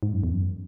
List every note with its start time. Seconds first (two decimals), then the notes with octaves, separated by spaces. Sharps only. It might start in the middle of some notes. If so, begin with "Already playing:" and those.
0.03 G#2
0.13 F#2
0.23 E2
0.33 F#2